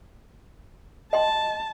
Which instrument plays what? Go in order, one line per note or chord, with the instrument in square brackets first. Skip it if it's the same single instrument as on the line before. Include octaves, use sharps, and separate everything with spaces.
[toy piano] D#5 G5 C6 [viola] A5